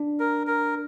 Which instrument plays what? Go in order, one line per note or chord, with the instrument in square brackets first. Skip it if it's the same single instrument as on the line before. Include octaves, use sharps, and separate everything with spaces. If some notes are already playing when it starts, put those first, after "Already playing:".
Already playing: [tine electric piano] D4
[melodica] A#4
A#4